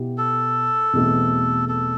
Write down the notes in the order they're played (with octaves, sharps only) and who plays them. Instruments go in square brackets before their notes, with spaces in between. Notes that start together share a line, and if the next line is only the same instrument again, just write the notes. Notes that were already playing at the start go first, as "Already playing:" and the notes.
Already playing: [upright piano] B2 B3 E4 G4
[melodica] A4
[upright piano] E2 B2 A3 C4
[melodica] A4